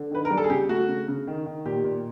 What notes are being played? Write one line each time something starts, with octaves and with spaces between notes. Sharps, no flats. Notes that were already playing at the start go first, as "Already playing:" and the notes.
Already playing: D3
D#3 B4
A#4
G3
A4
G#4
C#3 G4
A3 F#4
C#3
C#3
D#3
D#3
A#2 G4
A#2